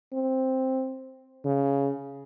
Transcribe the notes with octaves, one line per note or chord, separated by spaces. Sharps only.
C4
C#3